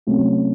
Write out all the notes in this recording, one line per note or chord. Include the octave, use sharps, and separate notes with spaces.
C3 F#3 A3 C#4